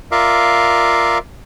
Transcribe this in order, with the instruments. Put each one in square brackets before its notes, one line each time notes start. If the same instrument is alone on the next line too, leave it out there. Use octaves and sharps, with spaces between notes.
[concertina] F4 A#4 D5 E5 F5